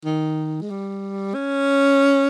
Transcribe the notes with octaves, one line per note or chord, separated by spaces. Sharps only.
D#3
G#3
G3
C#4